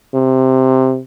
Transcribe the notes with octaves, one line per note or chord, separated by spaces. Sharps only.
C3